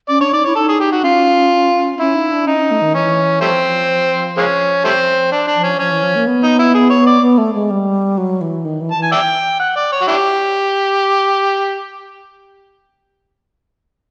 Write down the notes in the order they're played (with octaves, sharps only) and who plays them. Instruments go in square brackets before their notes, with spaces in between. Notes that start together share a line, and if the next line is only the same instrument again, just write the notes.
[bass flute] C#4 [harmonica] D5
[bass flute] D4 [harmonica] C#5
[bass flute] D#4 [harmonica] D5
[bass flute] E4 [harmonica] C#5
[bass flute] D#4 [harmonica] A4
[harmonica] G#4
G4
F#4
[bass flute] C#4 [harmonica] F4
[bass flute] C#4 [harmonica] E4
[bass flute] D#4
D4
[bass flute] C#4 [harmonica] D#4
[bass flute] C#4
A3
D#3
[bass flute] E3 [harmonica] C#4
[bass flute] F3 [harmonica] G3 A3 C4
[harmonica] G#3 A#3 C#4
G3 A3 C4
D4
D4
[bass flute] F3
[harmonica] C#4
[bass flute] F3 [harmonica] C#4
[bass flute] E3
F3
A#3
B3
[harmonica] D#4
E4
G#4
C#5
D5
[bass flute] B3
A3
G#3
G3
F#3
E3
D#3
E3
[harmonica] A5
[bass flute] E3
[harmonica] G#5
D5 E5 G5
F#5
D5
C#5
F#4
D4 E4 G4